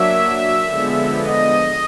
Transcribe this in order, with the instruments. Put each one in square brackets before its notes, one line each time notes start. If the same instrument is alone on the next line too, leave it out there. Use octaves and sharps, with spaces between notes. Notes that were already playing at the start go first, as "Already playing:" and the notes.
Already playing: [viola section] F#3 A#3 D4 E5
D3 F3 G#3 B3
D#5